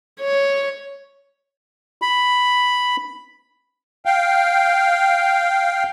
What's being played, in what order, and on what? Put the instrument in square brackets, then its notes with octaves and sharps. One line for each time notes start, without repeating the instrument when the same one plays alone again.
[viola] C#5
[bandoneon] B5
[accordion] F5 G5